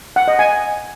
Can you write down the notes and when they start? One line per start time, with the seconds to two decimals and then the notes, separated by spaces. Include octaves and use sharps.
0.16 F#5
0.28 D#5
0.39 G#5